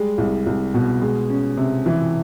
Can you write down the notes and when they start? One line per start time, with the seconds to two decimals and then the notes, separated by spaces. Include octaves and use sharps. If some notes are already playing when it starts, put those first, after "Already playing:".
Already playing: G3 G#3
0.18 C2
0.46 C2
0.74 B2
1.02 G#3
1.30 C#4
1.57 C3
1.86 E3